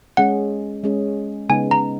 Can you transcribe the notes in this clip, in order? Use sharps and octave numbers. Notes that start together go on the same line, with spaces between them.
G#3 C#4 G#4 F#5
G#3 C#4 G#4
C#3 G#3 B3 D#4 G#5
A#5